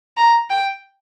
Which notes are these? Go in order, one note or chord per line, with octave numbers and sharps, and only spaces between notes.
A#5
G5